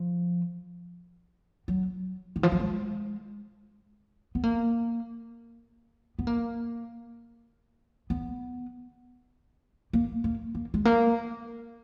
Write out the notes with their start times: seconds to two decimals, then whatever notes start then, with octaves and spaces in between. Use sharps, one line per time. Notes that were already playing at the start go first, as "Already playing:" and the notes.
Already playing: F3
1.68 F#3
2.36 D#3
2.43 F3
2.52 F#3
2.60 G#3
4.35 B3
4.43 A#3
6.19 B3
6.27 A#3
8.10 B3
9.93 A#3
10.24 A#3
10.55 A#3
10.74 G#3
10.85 A#3